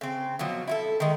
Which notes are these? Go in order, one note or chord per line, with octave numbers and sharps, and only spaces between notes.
C#3 C4
B2 F3 F#3
E4 F#4 A4
D#3 G#3